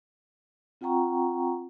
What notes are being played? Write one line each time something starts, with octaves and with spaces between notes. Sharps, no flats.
C4 F4 F#5 G5 A#5 C#6